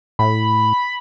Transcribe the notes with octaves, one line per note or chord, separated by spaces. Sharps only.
A2 B5